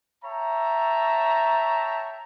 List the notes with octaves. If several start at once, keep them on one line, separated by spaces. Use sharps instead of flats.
C#5 E5 G5 A5 A#5